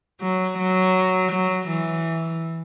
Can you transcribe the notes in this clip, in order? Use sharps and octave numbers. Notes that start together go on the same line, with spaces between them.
F#3
F#3
F#3
E3